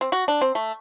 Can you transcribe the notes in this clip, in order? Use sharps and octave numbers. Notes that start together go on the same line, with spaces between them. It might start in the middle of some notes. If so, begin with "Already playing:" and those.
C4
F#4
D4
C4
A3